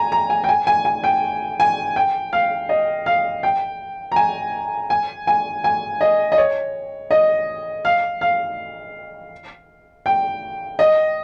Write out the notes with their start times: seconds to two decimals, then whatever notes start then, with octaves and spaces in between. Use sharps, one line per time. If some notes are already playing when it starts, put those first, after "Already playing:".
Already playing: G#5 A#5
0.12 A#5
0.30 G#5
0.44 G5
0.49 G#5
0.67 G#5
0.85 G#5
1.04 G5
1.60 G#5
1.96 G5
2.33 F5
2.69 D#5
3.06 F5
3.43 G5
4.12 A#5
4.16 G#5
4.90 G#5
5.27 G#5
5.64 G#5
6.01 D#5
6.32 D#5
6.37 C#5
7.11 D#5
7.85 F5
8.21 F5
10.06 G5
10.79 D#5